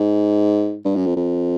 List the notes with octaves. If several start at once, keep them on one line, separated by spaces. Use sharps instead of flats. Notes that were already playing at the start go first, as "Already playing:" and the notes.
Already playing: G#2
G2
F#2
F2
F2